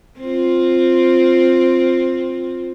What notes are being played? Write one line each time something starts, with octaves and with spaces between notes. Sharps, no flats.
C4 F4